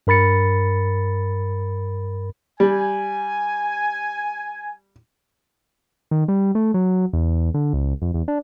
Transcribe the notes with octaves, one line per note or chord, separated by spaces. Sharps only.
G2 A#4 B5 A6 C#7
G3 G#5
D#3
G3
A3
F#3
E2
D3
C#2
F2
E2
D4